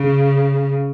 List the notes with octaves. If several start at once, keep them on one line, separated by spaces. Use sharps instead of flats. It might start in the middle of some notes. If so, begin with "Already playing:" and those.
Already playing: C#3